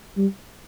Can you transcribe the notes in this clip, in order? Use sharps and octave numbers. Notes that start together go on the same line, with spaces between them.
G3